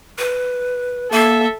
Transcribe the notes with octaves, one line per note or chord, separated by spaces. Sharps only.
B4
A#3 A4 E5